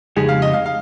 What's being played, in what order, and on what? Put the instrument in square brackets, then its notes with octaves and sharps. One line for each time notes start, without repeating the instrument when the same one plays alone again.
[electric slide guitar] F2 C#3 G#3 D#4 G4 [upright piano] G#4
[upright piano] F5
D#5
F5
F5